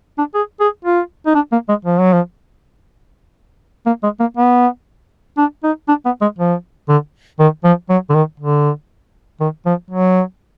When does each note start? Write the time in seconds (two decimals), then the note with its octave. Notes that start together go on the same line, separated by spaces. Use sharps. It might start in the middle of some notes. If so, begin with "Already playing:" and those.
0.18 D4
0.34 G#4
0.60 G#4
0.85 F4
1.26 D#4
1.35 D4
1.52 A#3
1.69 G#3
1.85 F3
2.00 F#3
2.13 F3
3.86 A#3
4.03 G#3
4.20 A#3
4.37 B3
5.38 D4
5.64 D#4
5.88 D4
6.05 B3
6.21 G#3
6.39 F3
6.89 D3
7.40 D#3
7.64 F3
7.89 F#3
8.10 D3
8.15 D#3
8.40 D3
9.40 D#3
9.66 F3
9.90 F#3